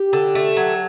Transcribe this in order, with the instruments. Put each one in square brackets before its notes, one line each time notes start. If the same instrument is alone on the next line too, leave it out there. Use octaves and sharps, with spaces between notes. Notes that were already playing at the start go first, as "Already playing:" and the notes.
Already playing: [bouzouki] G4
D3
A3
F#3